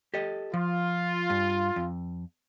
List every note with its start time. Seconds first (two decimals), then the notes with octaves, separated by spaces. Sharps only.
0.14 G4 A4 D#5
0.54 F3 F4
1.30 G2
1.76 F2